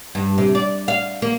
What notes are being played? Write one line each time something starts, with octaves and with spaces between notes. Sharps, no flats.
G2
C3
D5
F5
A#3